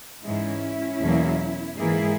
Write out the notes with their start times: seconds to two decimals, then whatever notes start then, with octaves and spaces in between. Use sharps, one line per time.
0.23 G#2 E3 G#3 C#4 E4
1.01 E2 B2 F#3 A#3
1.78 G#2 E3 A#3 E4 G#4